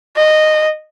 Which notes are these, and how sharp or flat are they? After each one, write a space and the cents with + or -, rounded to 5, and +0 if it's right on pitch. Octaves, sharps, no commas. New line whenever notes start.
D#5 -15